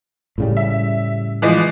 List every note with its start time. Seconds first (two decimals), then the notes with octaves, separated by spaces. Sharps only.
0.38 A2 C#3 G3
0.57 E5
1.42 E3 F3 G#3